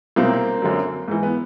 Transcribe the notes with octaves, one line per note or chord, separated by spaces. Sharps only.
C2 B2 F#3 A#3 C4
F#2 D3 F#3
G#2 E3
B3